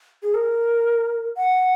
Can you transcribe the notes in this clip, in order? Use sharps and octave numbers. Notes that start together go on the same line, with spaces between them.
G#4
A#4
F#5